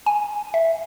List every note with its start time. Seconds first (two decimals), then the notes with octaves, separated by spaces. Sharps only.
0.06 G#5
0.54 E5